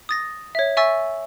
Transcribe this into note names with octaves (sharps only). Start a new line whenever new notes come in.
D#6 A6 A#6
C#5 E5
E5 G#5 C#6 E6 A6